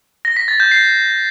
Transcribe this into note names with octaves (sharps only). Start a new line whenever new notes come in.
A#6
B6
A6
G6
C7